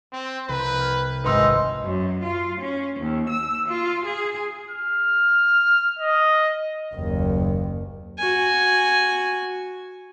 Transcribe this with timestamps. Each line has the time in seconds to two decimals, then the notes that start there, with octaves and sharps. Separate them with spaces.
0.12 C4 E7
0.49 C2 B4 A#5 G6
0.80 F6 G6 G#6
1.25 G#1 G#3 C4 D#4 B4 C6 E6
1.82 F#2
2.22 F4
2.59 C#4
2.99 D#2
3.29 E6
3.68 F4
4.05 G#4
4.70 F6
5.99 D#5
6.95 F#1 D#2
8.18 F#4 G#5